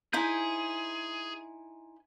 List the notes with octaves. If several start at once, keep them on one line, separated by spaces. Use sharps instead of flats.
D#4 E4 G#4 C5 G#5 G6